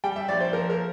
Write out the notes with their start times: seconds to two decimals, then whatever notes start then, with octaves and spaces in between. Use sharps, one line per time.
0.04 G3 G5
0.16 E5
0.28 A#1 D5
0.40 C5
0.53 F3 A#4
0.70 A#4